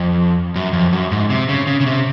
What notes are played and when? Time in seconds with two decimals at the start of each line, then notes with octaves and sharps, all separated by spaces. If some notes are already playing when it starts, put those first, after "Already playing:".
Already playing: F2
0.56 F#2
0.73 F2
0.93 F#2
1.12 G#2
1.30 C3
1.49 C#3
1.67 C#3
1.80 C#3
1.86 C3